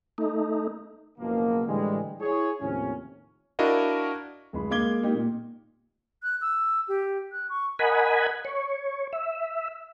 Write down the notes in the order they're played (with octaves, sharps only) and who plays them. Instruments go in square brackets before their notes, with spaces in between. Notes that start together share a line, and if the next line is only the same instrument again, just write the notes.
[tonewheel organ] A3 D#4
[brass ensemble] F#1 B2 F3 A#3
A2 D3 E3 G3 G#3
E4 G#4 C#5
D#2 A2 C3 F3 C#4
[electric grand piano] D4 E4 F#4 A#4 D#5 F5
[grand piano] D1 G#3 B5
G#3 A#3 F5 D6 G#6 G7
G#3 A#3 D#4 G4
A#2
[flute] F#6
E6
G4
F#6
C#6
[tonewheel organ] A#4 D#5 F#5 G#5 B5
C#5
E5